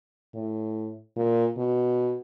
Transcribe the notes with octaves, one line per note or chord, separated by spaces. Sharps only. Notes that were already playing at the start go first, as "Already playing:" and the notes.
A2
A#2
B2